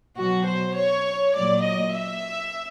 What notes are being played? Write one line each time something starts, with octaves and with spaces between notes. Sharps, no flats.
B2 F#3 F#4
C5
C#5
A#2 F#3 D5
D#5
E5